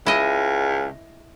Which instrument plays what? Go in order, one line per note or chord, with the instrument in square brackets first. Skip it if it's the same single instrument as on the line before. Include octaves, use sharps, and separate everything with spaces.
[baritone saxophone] C#2 [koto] E4 D#5